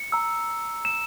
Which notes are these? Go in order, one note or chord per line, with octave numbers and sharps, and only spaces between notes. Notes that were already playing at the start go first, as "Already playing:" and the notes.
Already playing: C#7
A#5 E6
E7